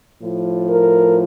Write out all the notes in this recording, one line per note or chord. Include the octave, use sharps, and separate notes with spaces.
A2 F3
A#4